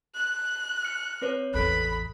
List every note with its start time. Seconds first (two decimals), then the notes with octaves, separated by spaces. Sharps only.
0.15 F#6
0.82 F6 C#7
1.22 C4 B4 C#5
1.54 A1 E2 A4 B5 F#6